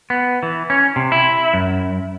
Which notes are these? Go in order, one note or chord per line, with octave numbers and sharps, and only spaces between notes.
B3
E3
C#4
C3
E4
F#2